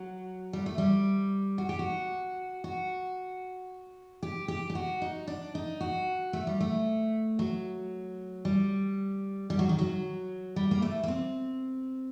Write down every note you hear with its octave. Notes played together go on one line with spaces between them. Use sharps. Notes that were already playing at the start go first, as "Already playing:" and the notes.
Already playing: F#3
G3
A3
G3
F#4
G4
F#4
F#4
G4
G4
G4
F#4
D#4
D4
D#4
F#4
A3
G3
A3
F#3
G3
G3
F#3
D#3
F#3
G3
A#3
A3
A#3
C4